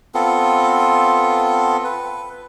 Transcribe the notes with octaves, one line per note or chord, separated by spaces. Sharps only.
B3 C4 F4 A4
B4